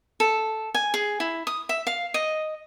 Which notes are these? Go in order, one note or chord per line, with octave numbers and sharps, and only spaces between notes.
A4
G#5
G#4
E4
D#6
E5
F5
D#5